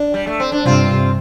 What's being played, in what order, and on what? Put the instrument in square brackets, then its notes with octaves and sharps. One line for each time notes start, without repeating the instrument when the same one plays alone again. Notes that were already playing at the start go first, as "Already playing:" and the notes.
Already playing: [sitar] D4
G3
A3
C4
D4
[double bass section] G2 C3 [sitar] C4 F4